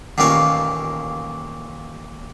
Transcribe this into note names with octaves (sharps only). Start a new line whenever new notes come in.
A1 D#2 A#2 A#3 F5 C#6